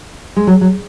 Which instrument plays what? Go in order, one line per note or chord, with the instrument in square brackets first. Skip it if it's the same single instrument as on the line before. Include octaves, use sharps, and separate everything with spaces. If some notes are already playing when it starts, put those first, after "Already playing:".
[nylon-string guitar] G#3
F#3
F#3